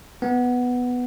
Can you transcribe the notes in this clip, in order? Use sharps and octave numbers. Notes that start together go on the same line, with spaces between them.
B3